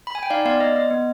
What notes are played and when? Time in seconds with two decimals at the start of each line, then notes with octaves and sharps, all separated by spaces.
0.07 B5
0.15 G#5
0.23 G5
0.30 D#4 D5 F5
0.45 B3 D5 F5
0.60 B3 D#5
0.76 B3 D#5
0.90 B3